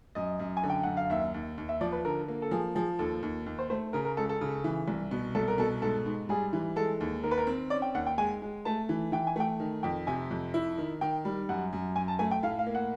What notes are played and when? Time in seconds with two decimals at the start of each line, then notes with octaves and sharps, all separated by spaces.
0.15 F#2 D#5
0.39 F#2
0.57 G#5
0.64 D3
0.70 G5
0.83 F#2 F#5
0.97 F5
1.10 D#2 E5
1.34 D#2
1.58 D#2
1.69 E5
1.81 F3 D5
1.92 B4
2.05 D3 A#4
2.28 A#3
2.42 A4
2.51 F3 G#4
2.75 F3 G#4
2.99 D#2 A4
3.23 D#2
3.46 D#2
3.59 C5
3.70 A3 C5
3.93 C#3 A#4
4.05 A#4
4.17 C#2 A4
4.29 A4
4.41 C#3
4.64 E3
4.88 C2
5.11 B2
5.35 C2 A4
5.48 A#4
5.58 B2 A4
5.82 G#2 A4
6.06 G#2
6.29 G3 G#4
6.53 E3
6.76 G#3 A4
7.00 D#2
7.24 D#3 A#4
7.31 B4
7.38 A#4
7.47 C4
7.70 C#4 D5
7.82 G5
7.94 D#2 F#5
8.06 G5
8.18 G#3 G#5
8.42 G#3
8.65 A3 A5
8.89 E3
9.12 E3 G5
9.27 G#5
9.36 A3 G5
9.60 D#3
9.83 F2 G5
10.07 C3 G#5
10.31 F2
10.54 E4
10.78 D#3
11.01 D#3 G5
11.25 G3
11.49 F#2 F#5
11.73 F#2
11.95 F#2 G#5
12.08 A5
12.19 A3 G#5
12.31 G5
12.43 A2 F5
12.59 F5
12.67 A#3
12.75 F#5